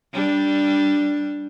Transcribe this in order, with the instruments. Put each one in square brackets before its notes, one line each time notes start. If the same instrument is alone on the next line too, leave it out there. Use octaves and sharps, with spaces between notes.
[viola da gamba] G3 D4